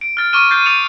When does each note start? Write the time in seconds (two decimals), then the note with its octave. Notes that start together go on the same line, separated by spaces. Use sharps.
0.01 D7
0.17 F6 A6
0.33 C#6 D6 F6 D#7
0.50 F6 G6 A6 C7 D#7
0.66 D#6 A6 C#7 D#7 F7